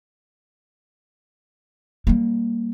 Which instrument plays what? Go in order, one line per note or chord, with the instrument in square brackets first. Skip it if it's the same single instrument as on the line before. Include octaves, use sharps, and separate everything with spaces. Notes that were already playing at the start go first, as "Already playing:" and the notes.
[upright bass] G3 A#3